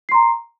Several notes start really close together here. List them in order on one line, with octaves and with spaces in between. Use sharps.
C7 C6 A#5